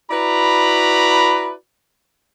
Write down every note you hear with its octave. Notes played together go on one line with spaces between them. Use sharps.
E4 F#4 B4 D5 A#5 B5